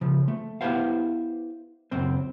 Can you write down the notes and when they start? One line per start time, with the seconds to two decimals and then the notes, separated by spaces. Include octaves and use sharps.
0.01 C#3 F3
0.28 A3
0.61 B3 E4 G4 B4 C5 F5
1.91 C#2 F#2 C4 C5